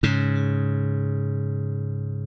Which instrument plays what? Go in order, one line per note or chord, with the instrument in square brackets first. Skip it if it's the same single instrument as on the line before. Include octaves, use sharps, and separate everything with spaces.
[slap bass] G#2 C#3